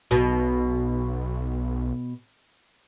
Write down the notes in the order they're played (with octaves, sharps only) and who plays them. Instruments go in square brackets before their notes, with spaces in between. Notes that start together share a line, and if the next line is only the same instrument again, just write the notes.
[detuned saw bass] B1 [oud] B2